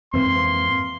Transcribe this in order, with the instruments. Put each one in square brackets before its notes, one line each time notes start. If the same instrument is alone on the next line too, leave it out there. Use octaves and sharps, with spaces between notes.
[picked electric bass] F2 G#2 E3 [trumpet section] A#3 C6 [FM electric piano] C4 B4